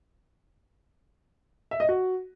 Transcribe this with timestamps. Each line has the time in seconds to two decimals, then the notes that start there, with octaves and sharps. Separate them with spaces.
1.71 E5
1.80 D#5
1.89 F#4